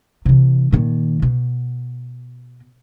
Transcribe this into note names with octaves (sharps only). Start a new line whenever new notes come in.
C3 E3
A#2 D#3
B2